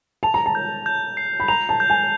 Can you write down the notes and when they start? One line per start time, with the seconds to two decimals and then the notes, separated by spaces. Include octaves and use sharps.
0.23 A5 F7
0.34 A#5
0.46 A5
0.55 G6
0.86 G6
1.17 C7
1.40 B5
1.48 A#5 F7
1.69 A5
1.80 G6
1.90 G#5